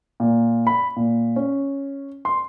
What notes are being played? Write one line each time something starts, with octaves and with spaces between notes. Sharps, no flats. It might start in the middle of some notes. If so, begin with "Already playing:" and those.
A#2
B5
A#2
C#4
C6